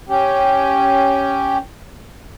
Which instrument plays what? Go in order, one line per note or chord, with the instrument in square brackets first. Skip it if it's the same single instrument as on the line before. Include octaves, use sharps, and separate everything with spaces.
[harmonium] C#4 G4